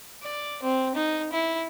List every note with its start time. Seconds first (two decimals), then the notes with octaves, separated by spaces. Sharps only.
0.23 D5
0.63 C4
0.95 D#4
1.32 E4